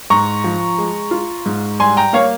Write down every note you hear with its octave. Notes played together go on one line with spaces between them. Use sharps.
G#2 A#5 C#6
F3
G#3
F4
G#2
G3 G#5 C6
G5 A#5
A#3 C#5 F5